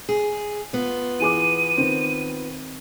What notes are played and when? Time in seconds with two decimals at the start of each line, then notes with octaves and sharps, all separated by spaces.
0.09 G#4
0.73 B3 F4
1.20 E3 G#4 D6 D#7
1.77 D#3 C4